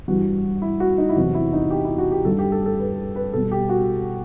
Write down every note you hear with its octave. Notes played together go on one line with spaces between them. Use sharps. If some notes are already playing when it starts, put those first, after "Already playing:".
G2 E3 G3 F#4
E4
F#4
D#4
E4
E2 C3 F#3 F#4
E4
D#4
G4
E4
F#4
G4
G2 D#3 G3 A4
G4
A4
A4
B4
B4
B2 G3 A4
G4
F#4